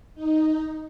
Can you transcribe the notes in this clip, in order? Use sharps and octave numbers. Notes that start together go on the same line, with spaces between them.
D#4